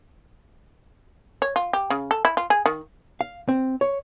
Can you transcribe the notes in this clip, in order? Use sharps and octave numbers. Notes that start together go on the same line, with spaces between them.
C#5
F4
G4
C#3
A4
E4
F4
G#4
D#3
F5
C4
C#5